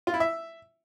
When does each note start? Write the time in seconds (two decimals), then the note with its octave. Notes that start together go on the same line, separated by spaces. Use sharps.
0.07 F4
0.14 E4
0.20 E5